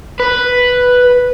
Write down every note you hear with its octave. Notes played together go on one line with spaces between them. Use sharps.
B4